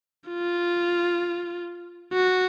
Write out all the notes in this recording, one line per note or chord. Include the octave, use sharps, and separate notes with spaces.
F4
F#4